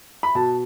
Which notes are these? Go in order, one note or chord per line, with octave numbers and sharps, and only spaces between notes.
B5
B2 A5